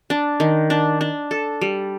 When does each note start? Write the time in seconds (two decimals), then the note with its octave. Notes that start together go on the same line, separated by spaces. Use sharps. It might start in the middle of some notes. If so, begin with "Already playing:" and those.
0.10 D4
0.40 D#3
0.70 D4
1.01 D4
1.31 A4
1.61 G3